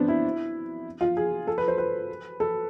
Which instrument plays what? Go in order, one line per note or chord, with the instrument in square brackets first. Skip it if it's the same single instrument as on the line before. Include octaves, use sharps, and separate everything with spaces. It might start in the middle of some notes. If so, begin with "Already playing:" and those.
Already playing: [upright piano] B3 C4 D4
E4
F4
G#4
A4
B4
C5
B4
A4